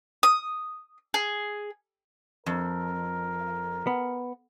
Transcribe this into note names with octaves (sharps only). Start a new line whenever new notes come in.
D#6
G#4
F2 A#4
B3